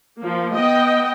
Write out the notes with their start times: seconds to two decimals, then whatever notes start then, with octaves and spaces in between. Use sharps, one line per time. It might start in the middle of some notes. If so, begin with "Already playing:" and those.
0.20 F3 A#3
0.54 B3 D#5 G5